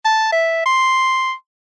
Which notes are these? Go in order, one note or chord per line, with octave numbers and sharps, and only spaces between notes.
A5
E5
C6